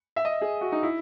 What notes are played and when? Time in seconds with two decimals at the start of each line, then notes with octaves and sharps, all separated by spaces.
0.16 E5
0.25 D#5
0.41 G#4
0.61 F#4
0.72 D#4
0.83 E4